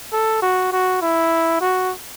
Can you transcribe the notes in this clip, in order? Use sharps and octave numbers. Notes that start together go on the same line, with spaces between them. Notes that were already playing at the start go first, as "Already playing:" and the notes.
A4
F#4
F#4
E4
F#4